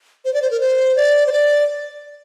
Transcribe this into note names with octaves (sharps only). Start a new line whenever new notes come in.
C5
D5
C5
A#4
C5
D5
C5
D5